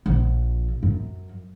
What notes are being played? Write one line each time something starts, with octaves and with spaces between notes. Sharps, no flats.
A#1
F#2